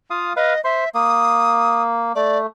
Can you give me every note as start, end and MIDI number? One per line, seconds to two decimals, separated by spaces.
0.10 0.33 65
0.10 0.33 77
0.10 0.33 87
0.37 0.54 71
0.37 0.63 75
0.37 0.54 77
0.64 0.84 72
0.64 0.89 76
0.64 0.84 84
0.94 2.12 58
0.94 1.82 87
2.15 2.47 57
2.15 2.38 74